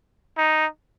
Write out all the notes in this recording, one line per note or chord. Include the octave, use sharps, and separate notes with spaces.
D#4